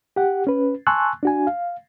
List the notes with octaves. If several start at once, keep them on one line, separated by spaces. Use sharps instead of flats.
G4 F#5
C#4 B4
G#5 A5 C6 C#6 E6 F#6
D4 F#4 G#5
F5